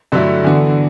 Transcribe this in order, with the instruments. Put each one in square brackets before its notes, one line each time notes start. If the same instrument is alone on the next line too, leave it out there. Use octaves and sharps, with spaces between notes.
[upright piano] G2 D3 F#3 A3 E4
[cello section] D3 [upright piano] E3 B3 F#4